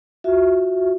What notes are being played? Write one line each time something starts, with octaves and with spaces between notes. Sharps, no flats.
F4 F#4 E5